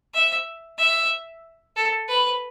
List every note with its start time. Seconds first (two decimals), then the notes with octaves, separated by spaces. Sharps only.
0.14 E5
0.78 E5
1.76 A4
2.08 B4